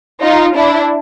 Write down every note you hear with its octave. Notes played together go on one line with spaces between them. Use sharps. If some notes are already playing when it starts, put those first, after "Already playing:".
D#4 F4
D4 E4